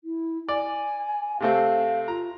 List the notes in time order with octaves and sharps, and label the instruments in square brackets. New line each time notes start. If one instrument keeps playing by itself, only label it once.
[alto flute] E4
[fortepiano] D5 [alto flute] G#5
[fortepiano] C3 A3 C4 [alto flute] F5
[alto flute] F4 [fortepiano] A#5